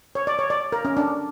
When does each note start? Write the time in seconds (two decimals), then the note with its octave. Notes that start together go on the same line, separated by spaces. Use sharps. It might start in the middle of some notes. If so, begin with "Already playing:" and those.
0.15 C#5
0.27 D5
0.39 C#5
0.50 D5
0.72 A#4
0.85 C#4
0.97 D4